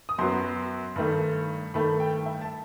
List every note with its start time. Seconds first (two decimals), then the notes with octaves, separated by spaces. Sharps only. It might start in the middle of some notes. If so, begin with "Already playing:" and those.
0.09 D#6
0.18 F#2 F#3 B3 C6
0.96 G2 D#3 A3
1.74 G2 D#3 A3 B5
2.00 G5
2.26 E5
2.41 A5